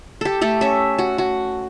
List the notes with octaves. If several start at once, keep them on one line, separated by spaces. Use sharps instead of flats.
G4 A4
A3 G4 A4
C#4 E5
F#4
F#4